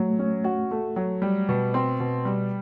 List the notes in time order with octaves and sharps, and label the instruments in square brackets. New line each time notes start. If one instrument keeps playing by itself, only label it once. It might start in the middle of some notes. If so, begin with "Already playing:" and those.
Already playing: [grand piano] F#3 [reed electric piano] A3
[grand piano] C#4
F#4
A3
F#3
G3
B2
C4
B2
G3